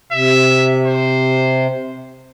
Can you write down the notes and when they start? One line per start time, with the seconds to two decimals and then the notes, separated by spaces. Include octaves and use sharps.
0.12 C3 E5
0.85 C5